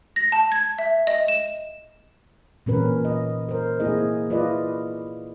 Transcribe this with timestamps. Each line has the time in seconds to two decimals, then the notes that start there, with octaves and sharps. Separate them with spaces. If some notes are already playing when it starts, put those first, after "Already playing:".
0.16 A#6
0.32 A5
0.52 G#6
0.79 E5
1.07 D#5
1.28 E7
2.66 A#2 E3 C4 C#4 A#4 B4
3.05 D#5
3.49 A#4 C5
3.80 A#3 C4 E4 G#4 D#5
4.30 E4 F4 B4 D5 D#5